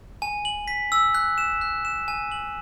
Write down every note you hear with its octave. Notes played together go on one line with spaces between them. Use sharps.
G#5
F#7
B6
E6
F#6
E7
F#6
E7
G#5
F#7